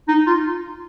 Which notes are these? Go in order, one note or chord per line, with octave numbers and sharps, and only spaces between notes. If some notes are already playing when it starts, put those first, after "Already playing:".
D#4
F4